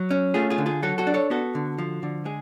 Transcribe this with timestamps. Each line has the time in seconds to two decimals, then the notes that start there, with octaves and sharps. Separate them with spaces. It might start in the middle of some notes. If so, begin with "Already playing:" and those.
Already playing: F#3
0.11 C#4
0.34 A3 F4 G#4
0.50 F4 G#4
0.58 D3
0.66 F4 G#4
0.83 F#3 F#4 A4
0.98 F#4 A4
1.07 D4
1.14 A4 C#5
1.30 B3 F#4 A4
1.55 D3
1.78 F3
2.03 D3
2.25 G#3 G#4